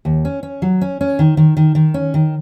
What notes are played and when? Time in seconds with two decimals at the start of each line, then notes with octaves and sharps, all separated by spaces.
0.05 D#2
0.25 C#4
0.43 C#4
0.62 F#3
0.81 C#4
1.01 C#4
1.19 D#3
1.37 D#3
1.57 D#3
1.75 D#3
1.94 C#4
2.14 D#3